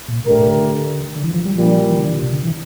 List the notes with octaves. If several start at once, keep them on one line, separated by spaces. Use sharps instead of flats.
A#2
A#2 A3 D4 G4 A#4
A2
A#2
D3
D3
E3
F3
G3
A#2 F3 G3 D4
E3
D3
E3
D3
C3
D3
E3